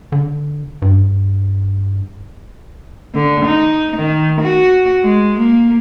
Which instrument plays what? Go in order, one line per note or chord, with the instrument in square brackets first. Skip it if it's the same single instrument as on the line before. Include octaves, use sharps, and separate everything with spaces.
[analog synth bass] D3
G2
[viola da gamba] D3
D#4
D#3
F#4
G#3
A#3